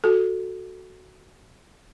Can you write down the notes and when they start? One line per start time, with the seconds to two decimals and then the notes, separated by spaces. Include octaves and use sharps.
0.04 F#4 A4